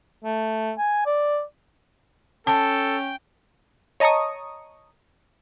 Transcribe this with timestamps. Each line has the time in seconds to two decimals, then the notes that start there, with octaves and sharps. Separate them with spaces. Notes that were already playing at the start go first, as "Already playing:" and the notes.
0.24 A3
0.78 G#5
1.06 D5
2.47 C#4 A4 G5 A5
4.00 C#5 D#5 A5 A#5 C#6 D#6